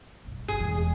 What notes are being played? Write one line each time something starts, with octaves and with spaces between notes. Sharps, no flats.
B1 G2
G1 G#4
E1 E2